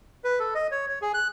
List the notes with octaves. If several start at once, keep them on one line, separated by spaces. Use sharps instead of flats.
B4
A4
D#5
C#5
C#5
G#4
F#6